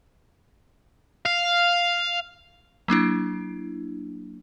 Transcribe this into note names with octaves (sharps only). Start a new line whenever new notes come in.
F5
F#3 A#3 D4 E4